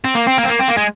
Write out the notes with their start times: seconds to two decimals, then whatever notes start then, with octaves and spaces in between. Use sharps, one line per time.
0.05 C4
0.15 A#3
0.27 C4
0.38 A#3
0.44 C4
0.48 A#3
0.59 C4
0.68 A#3
0.77 G#3